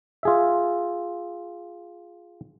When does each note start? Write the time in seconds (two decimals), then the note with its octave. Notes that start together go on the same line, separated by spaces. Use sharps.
0.23 F4 G#4 E5